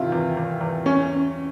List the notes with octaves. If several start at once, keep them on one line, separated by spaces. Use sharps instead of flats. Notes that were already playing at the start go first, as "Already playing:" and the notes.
Already playing: E2 C3 D#3 E4 F4
E2
E2
E2
C#4